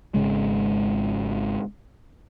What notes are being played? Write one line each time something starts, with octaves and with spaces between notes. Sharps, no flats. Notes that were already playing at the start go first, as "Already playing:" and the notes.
G#1 E2 C#3 G#3